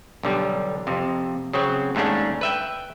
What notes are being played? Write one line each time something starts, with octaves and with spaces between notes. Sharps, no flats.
B1 D3 G3
F2 C3
C#3 F#3 C4
D#2 G#2 A3 C#4 D4
B4 E5 G5